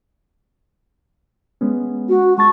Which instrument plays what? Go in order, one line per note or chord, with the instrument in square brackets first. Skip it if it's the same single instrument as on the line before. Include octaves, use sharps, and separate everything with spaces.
[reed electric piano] G#3 B3 C#4
[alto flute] F#4
[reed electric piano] G#3 A5 A6 [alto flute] C#6